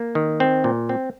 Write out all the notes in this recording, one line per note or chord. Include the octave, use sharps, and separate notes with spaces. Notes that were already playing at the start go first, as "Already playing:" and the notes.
Already playing: A#3
D#3
C4
A#2
C4